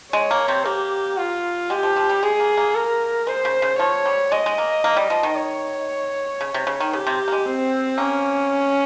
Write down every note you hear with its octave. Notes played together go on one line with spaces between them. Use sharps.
G#3 C#5
A#3
C3 C4
A#3 G4
F4
G#3 G4
F3
F3
G3
G#3 G#4
A#3
A#3
A#4
G#3 C5
C#3
C#3
F3 C#5
G3
G#3 D#5
G#3
A#3
A#3
G3
F3
D#3
C#5
C#3
C3
C#3
D#3
C#3 G4
C3 C4
A#3
G#3
C4
A#3 C#4